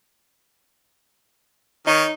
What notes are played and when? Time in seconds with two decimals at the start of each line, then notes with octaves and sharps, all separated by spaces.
1.87 D#3 D#4 C#5